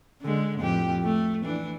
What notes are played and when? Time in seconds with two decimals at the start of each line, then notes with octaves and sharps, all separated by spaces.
0.22 D3 G#3
0.59 F2 A2 G4
1.04 A3
1.44 E3 D4